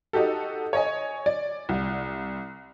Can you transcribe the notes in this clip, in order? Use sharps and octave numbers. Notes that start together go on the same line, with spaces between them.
D#4 F#4 G4 A4
C#5 D#5 G#5
D5
C2